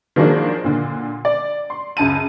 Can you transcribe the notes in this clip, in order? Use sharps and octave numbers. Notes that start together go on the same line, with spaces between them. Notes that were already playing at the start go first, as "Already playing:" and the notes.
D#3 F3 F#3 G#3 A#3 D4
A#2 D3
D5
C6
C#2 F#2 A5 D#7